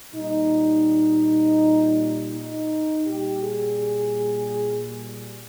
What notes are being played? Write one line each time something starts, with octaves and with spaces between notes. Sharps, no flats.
A#2 G3 D#4
D#4
A#2 G3 G4
G#4